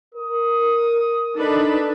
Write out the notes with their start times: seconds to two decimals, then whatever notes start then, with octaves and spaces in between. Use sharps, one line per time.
0.15 A#4 D#6
1.35 D4 D#4 A4 B4